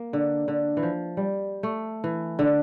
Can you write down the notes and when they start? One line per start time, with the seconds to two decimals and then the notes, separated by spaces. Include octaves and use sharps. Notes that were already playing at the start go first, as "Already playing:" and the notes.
Already playing: A#3
0.13 D3
0.48 D3
0.77 E3
0.83 F3
1.17 G3
1.63 A3
2.04 E3
2.39 D3